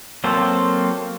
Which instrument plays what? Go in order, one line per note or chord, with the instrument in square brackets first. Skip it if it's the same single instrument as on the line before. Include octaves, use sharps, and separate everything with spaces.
[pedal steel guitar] F#3 A#3 C4 A4 C5